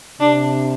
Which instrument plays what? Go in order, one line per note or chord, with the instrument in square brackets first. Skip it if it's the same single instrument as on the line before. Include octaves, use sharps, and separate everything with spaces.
[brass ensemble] C3 [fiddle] D4